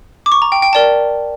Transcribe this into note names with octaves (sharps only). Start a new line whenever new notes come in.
D6
C#6
A#5
G5
G5
A#4 D5 G5 A5